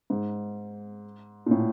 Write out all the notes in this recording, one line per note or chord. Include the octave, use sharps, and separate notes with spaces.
G#2
A#2
A2